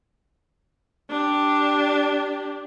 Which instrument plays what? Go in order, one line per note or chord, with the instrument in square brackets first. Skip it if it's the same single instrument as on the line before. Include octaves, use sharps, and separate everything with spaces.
[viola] D4 G4